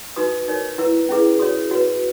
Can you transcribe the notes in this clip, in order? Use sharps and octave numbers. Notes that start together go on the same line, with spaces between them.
D#4 F#4 B4 D#6
D#4 A#4 C#5
E4 B4 E6
C#4 E4 G#4 B4
F#4 C#5 D#6
F#4 B4